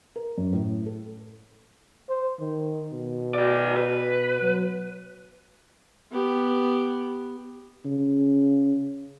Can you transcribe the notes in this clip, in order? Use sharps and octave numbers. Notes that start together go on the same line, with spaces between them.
A#4
F#2
A2
A4
C5
D#3
B2
F#4 D5
B4
F#3
B3 G4
C#3